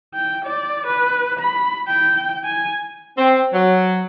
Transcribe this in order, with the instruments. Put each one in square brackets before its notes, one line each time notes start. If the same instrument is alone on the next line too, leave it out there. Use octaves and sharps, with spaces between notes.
[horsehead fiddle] G5
D5
B4
B5
G5
G#5
[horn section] C4
F#3